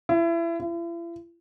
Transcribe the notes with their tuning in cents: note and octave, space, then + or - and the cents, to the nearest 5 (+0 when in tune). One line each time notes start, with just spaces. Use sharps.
E4 +30
E4 +45